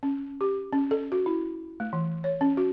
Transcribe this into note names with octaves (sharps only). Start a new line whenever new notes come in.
C#4
G4
C#4
A4
F#4
E4
A3
E3
C#5
C#4
F#4